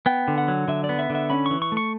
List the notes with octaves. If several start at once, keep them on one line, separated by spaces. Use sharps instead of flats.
B3 G5
D3
F#5
F#3
D3 E5
D5
B3
E5
D3
E5
C#4 B5
E3 C#6
C#6
A3
C#6